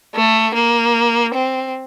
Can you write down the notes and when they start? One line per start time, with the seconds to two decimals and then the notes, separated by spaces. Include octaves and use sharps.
0.15 A3
0.55 A#3
1.34 C4